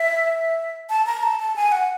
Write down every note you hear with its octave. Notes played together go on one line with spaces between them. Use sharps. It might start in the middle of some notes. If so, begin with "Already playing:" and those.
Already playing: E5
A5
A#5
A5
A5
G#5
F#5